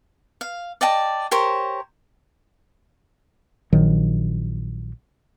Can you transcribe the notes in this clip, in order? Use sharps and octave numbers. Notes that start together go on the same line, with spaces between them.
F5
D5 D#5 G5 A5
G4 A#4 C5 C#5
A#1 D#3 F#3